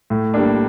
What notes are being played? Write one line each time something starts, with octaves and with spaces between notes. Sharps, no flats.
A2
G3 A#3 D4